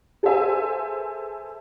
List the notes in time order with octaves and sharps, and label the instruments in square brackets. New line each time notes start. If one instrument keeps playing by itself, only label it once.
[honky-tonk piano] G#4 A4 B4 C5 E5 G#5